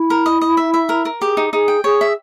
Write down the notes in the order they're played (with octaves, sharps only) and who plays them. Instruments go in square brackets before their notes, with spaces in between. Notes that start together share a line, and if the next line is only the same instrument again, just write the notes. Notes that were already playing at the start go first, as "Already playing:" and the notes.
Already playing: [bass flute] E4
[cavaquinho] A#4
D#5
D#5
E5
E5
A#4
A#4
[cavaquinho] G4 [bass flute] G#4
[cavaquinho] D#4
[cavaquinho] D#4 [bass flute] G#4
[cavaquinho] G5
[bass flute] G#4 [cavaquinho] C#5
[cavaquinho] E5